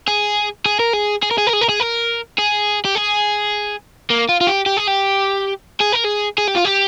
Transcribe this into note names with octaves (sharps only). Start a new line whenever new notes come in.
G#4
G#4
A#4
G#4
G#4
A#4
G#4
A#4
G#4
A#4
G#4
A#4
G#4
G4
G#4
A#3
F4
F4
G4
G4
G#4
G4
G#4
A#4
G#4
G#4
G4
F4
G4